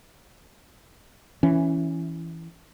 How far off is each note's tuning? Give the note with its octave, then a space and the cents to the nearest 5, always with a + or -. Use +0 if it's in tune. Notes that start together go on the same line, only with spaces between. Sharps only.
E3 +0 C#4 +0